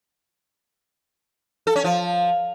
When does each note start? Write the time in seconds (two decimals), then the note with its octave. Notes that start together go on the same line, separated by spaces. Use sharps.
1.67 A4
1.76 C#4
1.84 F3